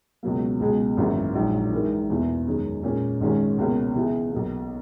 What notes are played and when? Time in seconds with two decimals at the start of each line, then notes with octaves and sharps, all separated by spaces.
0.23 C#2 B2 F#3 A#3
0.60 C#2 B2 G#3
0.97 G#1 F#2 E3 A#3 E4
1.35 A#1 G#2 F#3
1.72 G#2 E3 G#3 D#4 A#4
2.10 E2 B2 A#3 E4
2.46 F#2 D#3 G#3 C#4
2.83 A#2 G#3 C#4
3.20 G#1 G#2 D#3 G#3 C#4
3.58 C#2 B2 A#3 C#4
3.95 C#3 E3 B3 E4 G#4
4.32 B1 B2 A#3